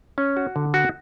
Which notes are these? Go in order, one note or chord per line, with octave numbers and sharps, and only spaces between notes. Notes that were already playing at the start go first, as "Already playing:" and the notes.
C#4
F#4
D3
F#4